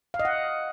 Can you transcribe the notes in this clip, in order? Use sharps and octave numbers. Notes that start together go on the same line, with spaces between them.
F5
D#5
F#5